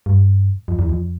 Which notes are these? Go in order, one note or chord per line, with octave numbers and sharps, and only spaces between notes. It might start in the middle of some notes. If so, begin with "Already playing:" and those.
G2
F2
E2
F2